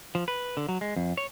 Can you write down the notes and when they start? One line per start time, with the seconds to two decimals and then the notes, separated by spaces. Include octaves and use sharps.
0.15 F3
0.28 B4
0.57 D3
0.69 F#3
0.81 G#3
0.96 F2
1.17 C#5